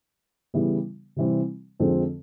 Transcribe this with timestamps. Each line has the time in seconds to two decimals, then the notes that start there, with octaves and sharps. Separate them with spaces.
0.54 C#3 E3 G3 B3 E4
1.16 C3 E3 G3 C4
1.80 F2 D3 F3 G#3 C4